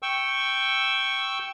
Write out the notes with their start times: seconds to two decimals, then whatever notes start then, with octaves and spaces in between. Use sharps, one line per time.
0.02 G5 C#6 E6